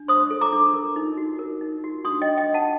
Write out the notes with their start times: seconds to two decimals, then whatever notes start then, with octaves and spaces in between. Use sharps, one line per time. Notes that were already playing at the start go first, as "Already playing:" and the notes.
Already playing: D4
0.08 C5 C6 D#6
0.30 A4
0.41 A#5 D6
0.53 D4
0.74 A#4
0.96 D#4
1.17 F#4
1.39 A#4
1.61 D#4
1.84 F#4
2.05 D4 C6 D#6
2.22 D#5 G5
2.27 D4
2.37 D#5 G5
2.49 D4
2.54 F#5 A5